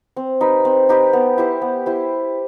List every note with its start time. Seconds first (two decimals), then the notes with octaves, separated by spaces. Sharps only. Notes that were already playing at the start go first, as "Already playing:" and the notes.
0.17 C4
0.41 D#4 G4 B4
0.65 C4
0.89 D#4 G4 B4
1.13 B3
1.38 E4 G4 C5
1.62 B3
1.86 E4 G4 C5